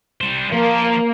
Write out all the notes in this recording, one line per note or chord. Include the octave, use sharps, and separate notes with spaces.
G3 C5
F3 A#3